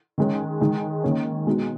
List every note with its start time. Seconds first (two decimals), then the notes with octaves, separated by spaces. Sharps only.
0.18 D#3 G#3 C#4
0.60 D#3 G#3 D#4
1.04 D#3 A#3 C#4
1.47 B2 G#3 D#4